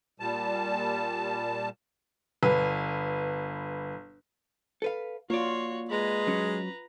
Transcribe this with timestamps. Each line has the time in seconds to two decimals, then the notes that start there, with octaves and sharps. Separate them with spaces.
0.20 A#2 G3 A5
2.43 G1 B4
4.82 A4 B4 F5
5.30 A#3 F4 F#4 C#5 D5
5.90 G#3 B4 A#5
6.27 F#3 C#4